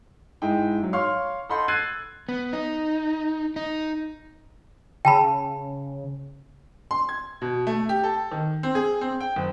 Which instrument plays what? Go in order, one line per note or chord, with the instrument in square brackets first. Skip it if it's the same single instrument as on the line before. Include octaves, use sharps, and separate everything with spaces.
[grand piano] G#2 G#3 D#4 E4 G5
G#2 F#3
C#5 F5 C6 C#6 F6
A4 D#5 F#5 B5 C6 G6
E6 F#6 G#6 A6 C7 D#7
[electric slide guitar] B3
D#4
D#4
[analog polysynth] C#3 [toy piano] G5 A5 B5
[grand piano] C6
G#6
B2
A3
G4
A4
D#3
C4
G#4
C4
G5
F#1